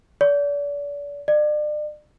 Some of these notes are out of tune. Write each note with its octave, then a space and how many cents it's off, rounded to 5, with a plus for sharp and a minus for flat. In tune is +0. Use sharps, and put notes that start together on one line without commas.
D5 -35
D5 +35